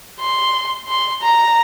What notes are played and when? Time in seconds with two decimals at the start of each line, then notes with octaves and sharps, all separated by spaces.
0.20 C6
0.89 C6
1.23 A#5